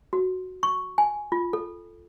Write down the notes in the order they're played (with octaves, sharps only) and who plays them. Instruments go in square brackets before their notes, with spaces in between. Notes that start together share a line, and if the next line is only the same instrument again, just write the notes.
[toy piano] F#4
C#6
G#5
F4
A4